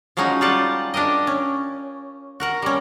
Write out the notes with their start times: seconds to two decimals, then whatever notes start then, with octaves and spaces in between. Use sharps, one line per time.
0.17 F3 F#3 G#3 C#4 D#4
0.41 G3 G#3 F4 G4 F#5 A5
0.94 D4 G4 A#4 D#5
1.27 C#4
2.40 F#4 A#4 F#5
2.62 G3 C#4